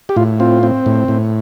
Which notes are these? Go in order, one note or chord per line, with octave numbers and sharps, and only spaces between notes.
G4
A2 F4
C4 F4
C4
A2
A2